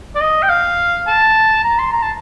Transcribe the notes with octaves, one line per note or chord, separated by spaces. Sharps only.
D5
D#5
G5
F5
A5
A#5
C6
A#5
A5